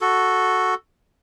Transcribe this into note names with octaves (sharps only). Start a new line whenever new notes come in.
F#4 A4